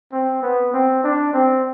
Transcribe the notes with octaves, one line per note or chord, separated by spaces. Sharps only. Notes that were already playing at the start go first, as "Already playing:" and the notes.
C4
B3
C4
D4
C4